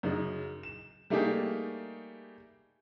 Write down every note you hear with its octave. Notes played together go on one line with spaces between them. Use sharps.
F#2 C#3 D#4
E7
G3 A3 A#3 D#4 G4 G#4